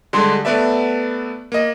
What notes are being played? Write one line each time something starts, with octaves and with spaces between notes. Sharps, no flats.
D3 G3 G#3 C6
A3 B3 B4 D5 E5
A#3 D#5